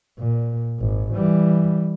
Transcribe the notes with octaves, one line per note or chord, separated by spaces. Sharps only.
A#2
G#1
E3 G3